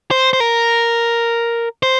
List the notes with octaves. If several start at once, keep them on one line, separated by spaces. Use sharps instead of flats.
C5
C5
A#4
C5